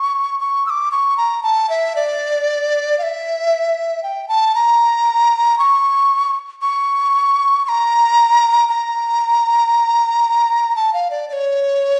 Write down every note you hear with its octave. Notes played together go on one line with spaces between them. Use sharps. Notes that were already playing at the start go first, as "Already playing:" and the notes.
Already playing: C#6
C#6
E6
D6
C#6
A#5
A5
E5
D5
F5
E5
G5
A5
A#5
C#6
C#6
C#6
A#5
A#5
A5
F5
D5
D5
C#5